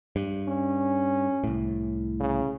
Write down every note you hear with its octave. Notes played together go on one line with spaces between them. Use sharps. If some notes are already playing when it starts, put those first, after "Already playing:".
G2
C#4
C2 A2
C#3